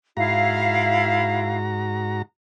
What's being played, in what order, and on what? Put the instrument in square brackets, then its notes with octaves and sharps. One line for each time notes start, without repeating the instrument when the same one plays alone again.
[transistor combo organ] G#2 F#4 A#5 [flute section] E4 F5